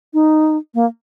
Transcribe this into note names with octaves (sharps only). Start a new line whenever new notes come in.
D#4
A#3